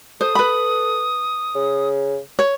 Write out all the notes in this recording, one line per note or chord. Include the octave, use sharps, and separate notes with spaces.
A4 C5 D#6
B4 B5
C#3
C#5